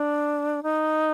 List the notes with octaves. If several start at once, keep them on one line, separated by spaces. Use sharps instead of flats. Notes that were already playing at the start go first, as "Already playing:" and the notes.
Already playing: D4
D#4